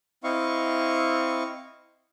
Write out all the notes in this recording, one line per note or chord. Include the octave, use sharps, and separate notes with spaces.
C4 E4 D#5 F5 C#6